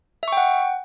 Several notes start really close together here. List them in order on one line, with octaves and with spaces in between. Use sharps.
E5 C#6 G5 F#5